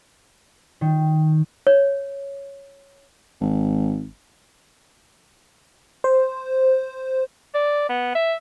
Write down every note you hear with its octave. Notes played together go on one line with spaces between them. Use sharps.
D#3
C#5
G#1
C5
D5
B3
E5